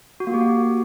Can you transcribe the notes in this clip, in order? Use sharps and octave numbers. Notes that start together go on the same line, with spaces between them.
F#4
A#3
G4
F#4